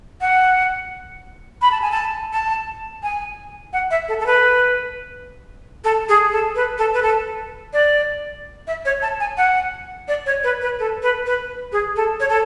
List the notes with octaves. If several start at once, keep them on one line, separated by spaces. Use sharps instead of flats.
F#5
B5
A5
G#5
A5
A5
G#5
F#5
E5
A4
A4
B4
A4
G#4
A4
B4
A4
B4
A4
D5
E5
C#5
A5
G#5
F#5
D5
C#5
B4
B4
A4
B4
B4
G#4
A4
C#5
A4